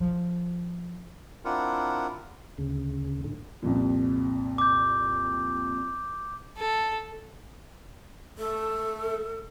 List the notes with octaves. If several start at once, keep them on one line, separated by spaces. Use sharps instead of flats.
F3
C4 D4 E4 F4 A#4 F#5
D2 C#3
A2 D3
C2 F2 A#2
D6 G6
A4
A3 A4